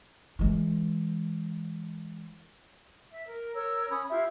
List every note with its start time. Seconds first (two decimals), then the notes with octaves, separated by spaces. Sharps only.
0.39 E3 G#3
3.11 E5
3.26 A#4
3.55 A#4 C#5 E6
3.90 C#4 C#5 B5 D#6
4.09 E4 F4 G4 E5